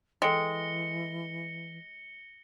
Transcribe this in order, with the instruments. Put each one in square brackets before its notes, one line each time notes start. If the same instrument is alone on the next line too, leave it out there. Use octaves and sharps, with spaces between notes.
[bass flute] E3 [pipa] G#3 [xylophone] A4 G5 [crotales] A#6 C#7 G7